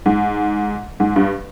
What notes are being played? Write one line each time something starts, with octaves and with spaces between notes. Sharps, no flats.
G#2
G#2
G2